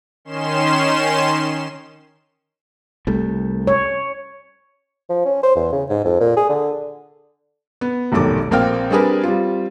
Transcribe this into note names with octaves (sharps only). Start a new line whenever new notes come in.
D#3 C#4 C6 E7
C2 G3 A3
C#5
F3
C#4
C5
E2
C#3
G#2
F2
A#2
G#4
D3
B3
F1 B1 G#2 D#3 A4 D6
A#1 A#3 C4 F5 G5 F6
G3 C4 D4 G#4 A#4 B4
G3 C4 F4